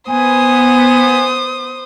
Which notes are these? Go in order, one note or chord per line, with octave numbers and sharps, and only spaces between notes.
B3 C5 G#5 D#6